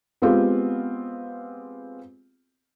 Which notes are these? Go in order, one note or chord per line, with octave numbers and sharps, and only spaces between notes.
G#3 B3 C4 F4 G4 G#4